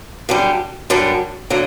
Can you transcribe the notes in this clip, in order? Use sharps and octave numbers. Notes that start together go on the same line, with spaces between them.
F#2 D3 G3
F#2 D3 G3
D3 F#3 A#3